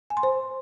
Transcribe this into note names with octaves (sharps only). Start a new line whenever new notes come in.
G#5
C6
C5